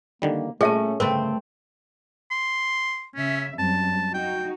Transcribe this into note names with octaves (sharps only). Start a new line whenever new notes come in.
D3 D#3 G3 A#3
A#2 A3 C#4 G#4 E5 A5
G1 C#3 A3 C4 A#4 B4
C6
C#3 C#4 E5
F#2 G3 C4 A5
D#4 F#4 G5